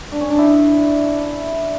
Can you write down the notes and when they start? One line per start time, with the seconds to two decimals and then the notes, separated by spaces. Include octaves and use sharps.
0.12 D4
0.21 C#4
0.30 D4
0.38 E4